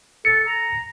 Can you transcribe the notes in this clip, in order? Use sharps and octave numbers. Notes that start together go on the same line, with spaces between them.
A4 C#7
A#5